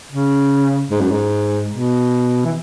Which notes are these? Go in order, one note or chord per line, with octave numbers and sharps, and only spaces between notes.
C#3
G#2
F#2
G#2
B2
E3